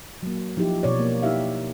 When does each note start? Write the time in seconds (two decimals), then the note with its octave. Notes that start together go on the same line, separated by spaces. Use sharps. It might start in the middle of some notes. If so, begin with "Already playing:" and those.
0.23 F#3 A#3
0.57 F3 D#4 E4 G4
0.83 B2 C#5 D5
1.00 A#3
1.22 D#4 E4 G4 E5 F5